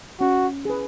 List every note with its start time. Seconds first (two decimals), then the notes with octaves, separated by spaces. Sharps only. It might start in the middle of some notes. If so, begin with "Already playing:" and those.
0.20 C#4 F#4
0.65 G#4 B4